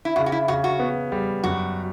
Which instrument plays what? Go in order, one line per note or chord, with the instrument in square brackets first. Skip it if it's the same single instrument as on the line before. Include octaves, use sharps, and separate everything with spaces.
[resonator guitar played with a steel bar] E4
[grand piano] C#3 [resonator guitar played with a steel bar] F#4
[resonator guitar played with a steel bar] F#4
E4
[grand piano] C#3 [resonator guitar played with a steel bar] F#4
[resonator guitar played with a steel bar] F#4
[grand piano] B3
G3
[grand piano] F#2 [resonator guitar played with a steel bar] F#4